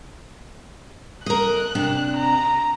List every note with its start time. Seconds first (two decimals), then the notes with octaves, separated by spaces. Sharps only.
1.26 A#4 D#5 F#6
1.75 C3 D4
2.17 A#5